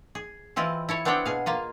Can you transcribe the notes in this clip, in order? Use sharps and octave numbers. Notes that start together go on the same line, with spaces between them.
G#4
E3 C4 E4 F4 D#5
E4 A4 C#5
B3 C4 D4 C#5 F#5 G5
B2 G#4 F5
A#3 F4 D#5